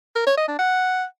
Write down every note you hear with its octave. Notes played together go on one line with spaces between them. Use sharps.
A#4
C#5
D#5
D4
F#5